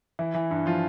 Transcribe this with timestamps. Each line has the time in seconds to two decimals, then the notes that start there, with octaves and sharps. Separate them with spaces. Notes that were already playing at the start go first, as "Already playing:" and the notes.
0.19 E3 E4
0.34 E3
0.51 G2
0.66 F3 F4